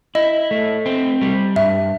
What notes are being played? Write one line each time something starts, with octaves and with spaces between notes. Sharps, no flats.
E4 D#5
A3
C4
G3
G2 E5